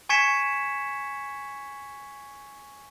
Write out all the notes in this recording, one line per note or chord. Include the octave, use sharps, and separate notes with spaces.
G#5 C#6 G#6 B6 C#7 E7